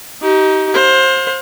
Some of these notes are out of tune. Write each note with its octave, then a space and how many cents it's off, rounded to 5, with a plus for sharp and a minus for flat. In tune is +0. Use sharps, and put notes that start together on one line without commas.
D#4 +15 G4 -30
C5 +20 F5 +40